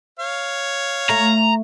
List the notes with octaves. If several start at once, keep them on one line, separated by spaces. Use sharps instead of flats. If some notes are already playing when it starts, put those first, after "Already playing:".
C#5 F5
A3 A#5